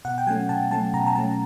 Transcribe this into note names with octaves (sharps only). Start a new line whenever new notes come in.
B2 F#5
G5
F#3 A3 C#4 G#5
B2 A5
F#3 A3 C#4 A5
B2 A#5
A#5
F#3 A3 C#4 A5